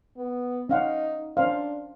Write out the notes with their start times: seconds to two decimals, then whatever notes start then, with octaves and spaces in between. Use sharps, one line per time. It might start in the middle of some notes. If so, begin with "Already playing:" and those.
0.17 B3
0.69 C#4 D#4 F5 F#5
1.37 C#4 D4 C5 F5